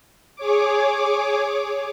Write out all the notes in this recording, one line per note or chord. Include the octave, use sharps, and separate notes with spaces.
G#4 C#5 D6